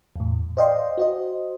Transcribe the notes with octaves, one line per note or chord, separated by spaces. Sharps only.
E2 A2
C5 D5 D#5 F5 G5 C6
F#4 C5 D#5